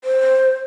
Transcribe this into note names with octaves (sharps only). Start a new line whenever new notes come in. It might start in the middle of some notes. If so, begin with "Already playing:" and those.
C5